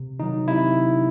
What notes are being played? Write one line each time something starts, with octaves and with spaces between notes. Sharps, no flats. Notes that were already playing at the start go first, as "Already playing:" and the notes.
Already playing: C3
D#3 F#3 D#4
C3 E4